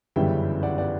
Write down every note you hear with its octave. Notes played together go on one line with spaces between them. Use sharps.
G1 F#2 C#3 E3 G3 E5 G5
D5 F#5
D5 F#5